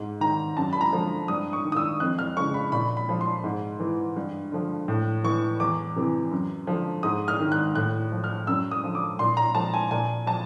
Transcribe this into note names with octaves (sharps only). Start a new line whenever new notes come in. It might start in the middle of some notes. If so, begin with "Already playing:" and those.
Already playing: G#2
D#3 A#5
F#2 A5
B5
A#5
D3 F3
G2 D#6
C#6
D#3
D#6
E6
F2 F#6
F6
C#3 F3 C#6
B5
A#2 B5
B5
F3
C6
G#2
E3
G2
D3 F3
A2
E3 C#6
E2 D6
C3 E3
F#2
D3 F3
G#2 D#6
F6
D#3
F#6
A2 F#6
F3
F6
F#2 E6
D#6
D3 F3
D6
A#2 C6
A#5
F3 A5
G#5
A#2 G#5
F3 A5